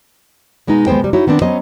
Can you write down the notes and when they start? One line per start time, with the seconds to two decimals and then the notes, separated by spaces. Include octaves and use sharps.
0.67 B2 G#3 B3 D#4
0.87 D#2 G#3 B3 C5 G5
1.00 C3 G3
1.13 D#4 E4 F#4 C#5
1.27 D#3 B3 C4 D4
1.42 F#3 B3 C#4 C5 D#5